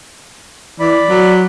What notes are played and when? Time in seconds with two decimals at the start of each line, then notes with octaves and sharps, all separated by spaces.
0.80 E3 D5 B5
1.09 F#3